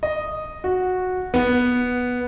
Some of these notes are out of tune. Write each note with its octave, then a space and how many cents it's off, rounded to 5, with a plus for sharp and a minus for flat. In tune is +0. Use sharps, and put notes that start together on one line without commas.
D#5 -5
F#4 -10
B3 -5